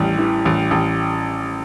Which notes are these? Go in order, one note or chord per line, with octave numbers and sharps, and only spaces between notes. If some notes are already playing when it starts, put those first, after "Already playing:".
Already playing: A1 E3 G3
E3
A1
A1